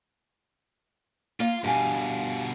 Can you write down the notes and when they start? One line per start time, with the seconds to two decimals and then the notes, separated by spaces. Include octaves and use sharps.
1.40 A#3 F4
1.64 G2 B2 G4 F5 G#5